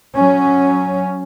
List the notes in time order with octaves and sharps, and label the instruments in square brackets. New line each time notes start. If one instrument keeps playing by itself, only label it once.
[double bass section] F#3 C#4